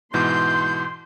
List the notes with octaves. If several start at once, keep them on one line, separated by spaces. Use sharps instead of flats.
G#2 B2 E3 C6 G6